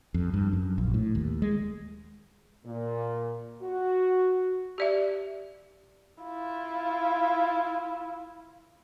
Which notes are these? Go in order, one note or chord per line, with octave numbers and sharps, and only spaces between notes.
F2
G2
F#2
A#1
A2
D#2
G#3
A#2
F#4
G4 D5 E5
E4 F4